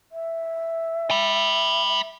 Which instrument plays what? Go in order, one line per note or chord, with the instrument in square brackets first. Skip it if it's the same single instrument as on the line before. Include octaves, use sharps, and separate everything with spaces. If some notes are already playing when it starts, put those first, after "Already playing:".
[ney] E5
[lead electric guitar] G5 B5
[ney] E5